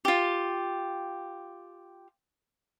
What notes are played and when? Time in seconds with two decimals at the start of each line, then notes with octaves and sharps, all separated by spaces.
0.05 F4 G4